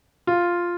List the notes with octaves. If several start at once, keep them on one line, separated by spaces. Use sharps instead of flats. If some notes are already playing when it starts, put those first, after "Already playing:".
F4